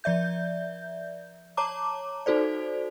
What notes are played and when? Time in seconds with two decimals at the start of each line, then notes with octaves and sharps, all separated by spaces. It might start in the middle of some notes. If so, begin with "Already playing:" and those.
0.04 F3 D5 E5 G6
1.57 C#5 A5 A#5 D6
2.26 D#4 F#4 A4 C5 D5